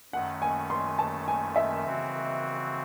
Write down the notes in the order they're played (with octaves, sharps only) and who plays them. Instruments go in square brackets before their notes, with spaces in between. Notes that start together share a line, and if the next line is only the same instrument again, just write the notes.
[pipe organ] F#2 D#3 A3 C#4 [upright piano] F#5
[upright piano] G#5
C6
A5
G#5
E5
[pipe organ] C#3 E3 C4 F#4